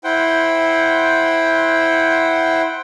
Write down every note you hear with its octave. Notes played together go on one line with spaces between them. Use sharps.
E4 C5 F#5 G5